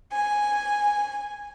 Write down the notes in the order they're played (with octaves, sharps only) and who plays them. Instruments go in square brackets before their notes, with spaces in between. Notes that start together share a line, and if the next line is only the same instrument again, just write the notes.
[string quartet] G#5